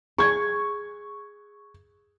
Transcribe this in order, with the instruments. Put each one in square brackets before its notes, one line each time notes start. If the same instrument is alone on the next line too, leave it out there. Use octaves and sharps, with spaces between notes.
[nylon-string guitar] G#4 [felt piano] C#6 G#6